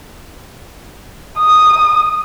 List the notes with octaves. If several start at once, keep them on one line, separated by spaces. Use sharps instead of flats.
D#6